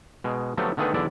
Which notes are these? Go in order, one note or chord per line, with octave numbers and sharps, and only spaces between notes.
B2 G#3
D3 F3 F#3 A3 B3 G4
D3 D#3 A3 B3 G#4 B4
B1 E2 D3 E4 D5 E5